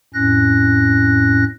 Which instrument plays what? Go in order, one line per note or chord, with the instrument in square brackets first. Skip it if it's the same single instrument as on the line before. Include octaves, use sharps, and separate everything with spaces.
[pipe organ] F2 A2 C#4 F#6 A#6